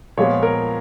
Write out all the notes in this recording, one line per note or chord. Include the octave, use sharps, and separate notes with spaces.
A#2 F3 G#3 B3 C#5
A#4